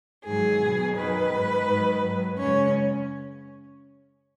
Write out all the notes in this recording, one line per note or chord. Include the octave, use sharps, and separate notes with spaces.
G#2 D#3 F#3 G#4
B2
F#3
F#2 D#3 F#3 B4
G#2 D#3 G#3
G#2 D#3 F#3
G#2 F#3
F#2 C#3 G#3 C#4 C#5